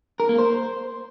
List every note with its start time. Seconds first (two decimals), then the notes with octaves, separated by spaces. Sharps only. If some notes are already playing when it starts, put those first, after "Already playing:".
0.20 A#4
0.29 A#3
0.39 C5